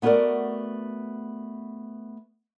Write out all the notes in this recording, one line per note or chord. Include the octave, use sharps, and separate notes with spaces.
A3 B3 E4 F#4 A#4 D5